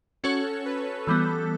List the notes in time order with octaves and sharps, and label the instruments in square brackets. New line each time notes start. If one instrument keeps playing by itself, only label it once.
[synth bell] C#4 F#4 C#5 [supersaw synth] A4
[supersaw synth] B4
[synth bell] E3 G3 B3 [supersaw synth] A4